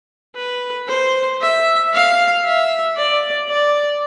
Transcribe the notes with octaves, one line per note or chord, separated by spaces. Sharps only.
B4
C5
E5
F5
E5
D5
D5